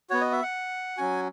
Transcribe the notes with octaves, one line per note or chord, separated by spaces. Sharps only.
B3 F#4 C#5
D#5
E5
F#5
F#3 C#4 F#4 G#5